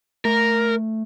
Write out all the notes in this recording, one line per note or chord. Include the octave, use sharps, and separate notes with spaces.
A3 A#4